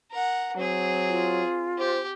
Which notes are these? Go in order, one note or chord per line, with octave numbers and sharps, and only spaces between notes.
A#4 F#5
F#3 C4 G#4
F4
G4 C5